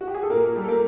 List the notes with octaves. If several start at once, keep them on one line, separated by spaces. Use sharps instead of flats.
F#4
G4
G#4
A4
A#2 A#3 A#4
G3
A4
A#3 A#4